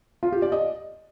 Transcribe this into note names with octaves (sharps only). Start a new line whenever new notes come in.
F4
G4
D5
D#5